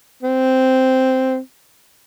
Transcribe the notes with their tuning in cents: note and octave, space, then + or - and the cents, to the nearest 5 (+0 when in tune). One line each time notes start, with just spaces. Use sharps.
C4 -5